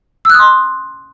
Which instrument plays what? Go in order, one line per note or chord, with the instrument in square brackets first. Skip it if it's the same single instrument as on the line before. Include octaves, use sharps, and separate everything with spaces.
[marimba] E6
F#6
D#6
C6